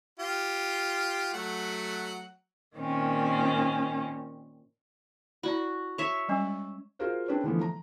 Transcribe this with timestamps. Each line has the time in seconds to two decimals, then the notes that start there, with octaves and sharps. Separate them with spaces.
0.19 F4 G4
1.33 F#3 A3 F#5
2.76 A#2 D#3 C4 C#4
5.43 E4 F#4 D5 B5
5.98 C#5 E5
6.28 G3 G#3 C#4
6.99 F4 F#4 G#4 A#4 C5 F5
7.28 C4 D4 G#4 B4 C#5
7.44 D3 E3 F3 A3 B3
7.61 A#5